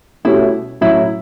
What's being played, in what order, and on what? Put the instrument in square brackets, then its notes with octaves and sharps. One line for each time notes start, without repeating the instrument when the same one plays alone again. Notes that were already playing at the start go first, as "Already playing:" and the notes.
[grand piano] B2 A3 C#4 G4 [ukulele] E4
[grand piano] A2 F#3 C#4 [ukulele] E4